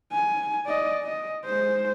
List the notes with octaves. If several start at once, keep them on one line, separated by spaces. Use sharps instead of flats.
G#5
D5 D#5
D#5
G#3 C5